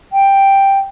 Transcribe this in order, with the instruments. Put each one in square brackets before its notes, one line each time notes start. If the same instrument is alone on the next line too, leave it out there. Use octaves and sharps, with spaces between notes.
[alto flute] G5